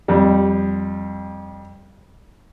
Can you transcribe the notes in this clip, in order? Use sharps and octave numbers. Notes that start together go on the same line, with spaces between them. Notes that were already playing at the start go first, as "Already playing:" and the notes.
F2 G3